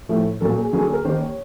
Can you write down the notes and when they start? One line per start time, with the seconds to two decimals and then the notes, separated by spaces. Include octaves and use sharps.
0.09 A2 F3 A3
0.41 A#2 F#3 A#3 A4
0.57 G#4
0.72 D3 F#3 A#3 G#4
0.83 G#4
0.93 A#4
1.05 D#3 G3 A#3 C5
1.21 C#5